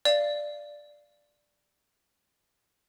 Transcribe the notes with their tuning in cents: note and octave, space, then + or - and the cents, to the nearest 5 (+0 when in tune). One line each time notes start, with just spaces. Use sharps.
D5 +0 F5 -20